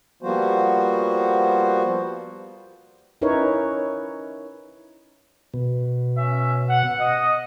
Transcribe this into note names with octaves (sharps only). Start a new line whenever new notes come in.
F3 G3 A#3 B3 F#4 C5
C#4 D#4 E4 A#4 B4 C#5
B2
C#4 E5
F#5
D#5